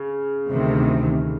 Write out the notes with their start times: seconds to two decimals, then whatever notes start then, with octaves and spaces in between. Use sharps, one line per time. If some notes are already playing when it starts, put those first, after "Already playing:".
Already playing: C#3
0.50 D2 C3 D#3